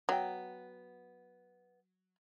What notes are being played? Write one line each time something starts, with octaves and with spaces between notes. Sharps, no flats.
F#3 B3 G5